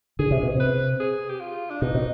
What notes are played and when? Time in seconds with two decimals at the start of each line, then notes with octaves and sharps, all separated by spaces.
0.19 D3 G#4
0.31 C3
0.43 B2
0.55 C3 B4
1.00 G#4
1.29 G4
1.40 F4
1.71 D4
1.82 B2 D#4
1.95 B2